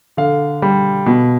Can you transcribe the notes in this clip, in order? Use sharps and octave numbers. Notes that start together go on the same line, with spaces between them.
D3 F5
G3
B2